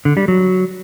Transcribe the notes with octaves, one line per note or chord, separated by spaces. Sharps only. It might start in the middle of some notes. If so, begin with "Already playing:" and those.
D3
G3
F#3